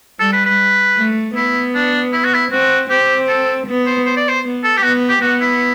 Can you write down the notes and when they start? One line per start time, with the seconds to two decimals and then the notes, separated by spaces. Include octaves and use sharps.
0.20 G3 A4
0.33 B4
0.45 B4
0.97 A3
1.36 B3 E4
1.75 D4
2.13 E4
2.24 F#4
2.34 E4
2.52 C4 F#4
2.90 C4 G4
3.28 A4
3.67 B3
3.86 C5
4.06 C5
4.17 D5
4.29 C5
4.44 B3
4.64 A4
4.77 G4
4.83 B3 F#4
5.09 G4
5.21 B3 F#4
5.41 E4